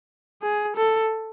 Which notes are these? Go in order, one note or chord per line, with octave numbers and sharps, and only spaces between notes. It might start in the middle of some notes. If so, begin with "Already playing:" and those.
G#4
A4